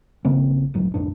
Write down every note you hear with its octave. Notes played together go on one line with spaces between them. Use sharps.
G#1 C#3 A#3 C4
D1 G#1 G#2 F#3
B1 F2 G#2 D4